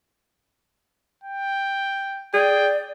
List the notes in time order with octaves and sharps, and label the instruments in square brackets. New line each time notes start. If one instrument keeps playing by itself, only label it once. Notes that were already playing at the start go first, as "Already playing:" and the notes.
[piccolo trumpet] G5
[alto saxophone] G#4 [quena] D5 [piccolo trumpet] G5